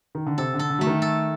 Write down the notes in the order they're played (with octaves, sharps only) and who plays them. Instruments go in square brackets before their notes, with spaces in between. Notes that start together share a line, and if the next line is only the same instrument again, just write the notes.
[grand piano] D#3
D3
[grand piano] C3 [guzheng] A4
[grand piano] D3
[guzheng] A4
[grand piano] D3
[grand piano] F#3 [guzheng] A3
[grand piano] D#3
[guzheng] A4